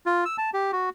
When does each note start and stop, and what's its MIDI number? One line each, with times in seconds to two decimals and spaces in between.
0.06 0.24 65
0.25 0.37 88
0.38 0.50 81
0.54 0.71 67
0.72 0.89 66